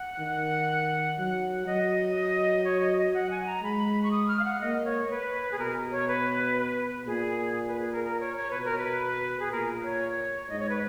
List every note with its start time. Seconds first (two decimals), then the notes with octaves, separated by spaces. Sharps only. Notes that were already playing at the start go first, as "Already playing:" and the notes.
Already playing: F#5
0.19 D#3
1.18 F#3
1.66 F#3 D#5
2.16 D#5
2.64 C#5
2.81 D#5
2.98 D#5
3.14 F#5
3.31 G#5
3.46 A#5
3.62 G#3 B5
4.03 C#6
4.11 D#6
4.28 F6
4.40 F5
4.44 F#5
4.61 A#3 D#5
4.85 C#5
5.11 B4
5.52 G#4
5.59 B2 A#4
5.92 C#5
6.08 B4
6.57 B4
7.06 A#2 G#4
7.67 B4
7.80 G#4
7.92 A#4
8.04 A#4
8.20 C#5
8.37 C#5
8.51 B2 B4
8.65 A#4
8.78 B4
9.40 G#4
9.51 A#2 A#4
9.84 C#5
10.49 G#2 D#5
10.59 C#5
10.70 B4